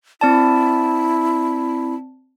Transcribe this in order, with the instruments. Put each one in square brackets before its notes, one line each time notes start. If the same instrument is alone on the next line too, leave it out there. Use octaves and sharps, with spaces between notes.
[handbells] C4 D5 A5 [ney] E4